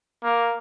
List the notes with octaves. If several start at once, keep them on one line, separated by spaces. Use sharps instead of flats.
A#3